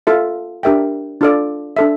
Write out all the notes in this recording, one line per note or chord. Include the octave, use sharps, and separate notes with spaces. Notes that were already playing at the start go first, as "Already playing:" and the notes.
F4 A4 E5
D4 G4 A#4 E5 G5
D4 F4 A4 D5
D4 A4 E5